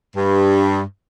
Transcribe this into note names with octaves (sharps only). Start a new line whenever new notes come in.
G2